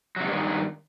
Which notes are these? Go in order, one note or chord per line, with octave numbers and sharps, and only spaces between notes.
G2 C3 D#3 F#3 G#3